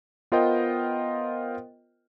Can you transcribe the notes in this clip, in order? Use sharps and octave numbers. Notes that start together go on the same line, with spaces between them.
B3 F4 A#4 C5 D#5 G5